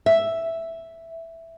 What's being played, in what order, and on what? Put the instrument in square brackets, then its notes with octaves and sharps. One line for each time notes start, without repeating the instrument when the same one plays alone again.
[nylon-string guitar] E5